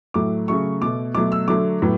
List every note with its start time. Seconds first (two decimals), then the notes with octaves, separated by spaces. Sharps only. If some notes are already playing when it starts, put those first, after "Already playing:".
0.14 A2 F#3 A3 D6
0.48 C#3 F#3 A3 C#6
0.82 B2 A3 D6
1.15 B2 F#3 A3 D6
1.32 E6
1.48 D3 F#3 A3 D6
1.81 A2 F#3 B3